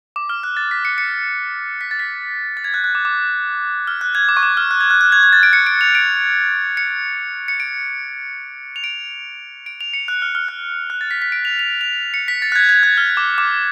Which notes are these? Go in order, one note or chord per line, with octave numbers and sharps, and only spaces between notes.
D6
F6
F#6
A6
B6
C#7
C#7
B6
A6
B6
A6
G#6
F#6
F#6
D6
D6
F6
F#6
G#6
D6
C#6
D6
F6
F#6
G#6
F#6
F#6
G#6
G#6
A6
D7
C#7
D7
F7
D7
C#7
C#7
D7
F7
D7
D7
F7
C#7
F#6
F6
F6
F#6
F#6
A6
B6
B6
D7
F7
F7
F7
C#7
B6
A6
F#6
G#6
G#6
F#6
F6
D6
D6